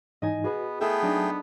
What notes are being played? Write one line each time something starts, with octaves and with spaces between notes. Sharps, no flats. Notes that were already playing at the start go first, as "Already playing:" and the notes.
G#2 E3 D#4 D#5 G#5
B3 F#4 G#4 B4
A3 B3 E4 G#4 A4 G5
F#3 D4 D#4